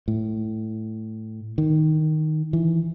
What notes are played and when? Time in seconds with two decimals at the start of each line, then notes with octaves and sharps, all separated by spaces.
0.08 A2
1.58 D#3
2.53 E3